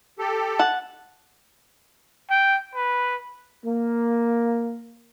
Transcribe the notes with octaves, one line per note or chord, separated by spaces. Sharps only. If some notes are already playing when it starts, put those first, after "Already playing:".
G4 A4
F#5 A5
G5
B4
A#3